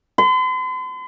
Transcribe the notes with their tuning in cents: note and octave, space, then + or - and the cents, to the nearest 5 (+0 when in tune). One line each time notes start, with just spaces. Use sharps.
C6 -45